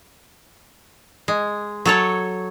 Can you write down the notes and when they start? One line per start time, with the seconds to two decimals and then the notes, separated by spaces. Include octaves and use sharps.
1.28 G#3
1.86 F#3 A4 C#5